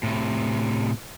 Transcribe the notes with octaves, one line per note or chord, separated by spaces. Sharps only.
A2 C3